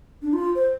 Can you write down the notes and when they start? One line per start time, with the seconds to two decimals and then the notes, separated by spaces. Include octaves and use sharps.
0.22 D4
0.33 F4
0.55 C5